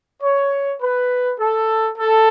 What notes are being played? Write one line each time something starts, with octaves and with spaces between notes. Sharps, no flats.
C#5
B4
A4
A4